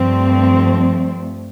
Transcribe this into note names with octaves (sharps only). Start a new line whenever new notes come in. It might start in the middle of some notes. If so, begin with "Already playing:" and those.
Already playing: G2 F3 A3 C4